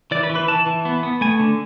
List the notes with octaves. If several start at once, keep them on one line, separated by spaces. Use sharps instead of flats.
E3 D5
B4
E3
B4
E3 A5
E3
B3
B3
A3 G#5
D3